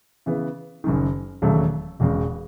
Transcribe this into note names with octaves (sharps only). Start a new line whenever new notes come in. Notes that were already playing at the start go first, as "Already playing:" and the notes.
C#3 E3 B3
F#1 F#2 D#3
E1 D#2 C#3 F#3 A3
E1 E2 C#3 G#3